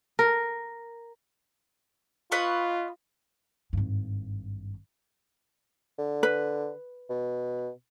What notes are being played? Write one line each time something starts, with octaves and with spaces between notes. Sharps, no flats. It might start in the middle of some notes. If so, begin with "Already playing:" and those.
A#4
F4 B4 D#5 C#6
G#1 G2
D3
B4
B2